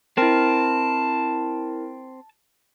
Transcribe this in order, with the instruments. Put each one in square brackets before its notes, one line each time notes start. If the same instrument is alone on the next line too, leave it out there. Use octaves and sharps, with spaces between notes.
[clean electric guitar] C4 [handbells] E4 A#4 [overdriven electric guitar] A5